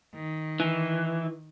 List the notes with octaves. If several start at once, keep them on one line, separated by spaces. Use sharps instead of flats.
D#3
E3